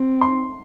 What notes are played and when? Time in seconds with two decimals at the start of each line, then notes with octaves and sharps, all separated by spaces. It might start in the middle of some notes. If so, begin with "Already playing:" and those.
Already playing: C4
0.21 C6